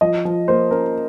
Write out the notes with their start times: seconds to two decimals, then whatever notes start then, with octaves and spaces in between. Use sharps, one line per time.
0.01 F3 D#5
0.25 F3
0.48 A#3 C5
0.71 C#4 A#4